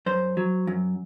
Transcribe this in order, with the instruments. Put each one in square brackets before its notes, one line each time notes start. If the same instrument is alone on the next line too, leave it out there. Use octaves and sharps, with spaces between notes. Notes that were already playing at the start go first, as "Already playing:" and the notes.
[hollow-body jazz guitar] F#2 C5
F#3
F#2